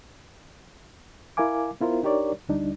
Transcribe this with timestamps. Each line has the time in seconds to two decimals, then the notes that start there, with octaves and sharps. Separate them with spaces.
1.37 E4 A#4 F5 G#5 D6
1.81 B3 E4 F4 A#4 C5
2.03 D4 D#4 G4 A#4 C#5 D5
2.49 D2 G3 D4 D#4